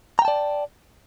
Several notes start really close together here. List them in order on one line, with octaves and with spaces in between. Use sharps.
A#5 G5 A5 D5